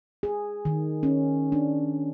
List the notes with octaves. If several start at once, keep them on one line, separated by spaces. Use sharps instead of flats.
G#4
D#3
C#4
D4